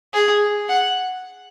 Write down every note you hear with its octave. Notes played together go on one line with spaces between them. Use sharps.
G#4
F#5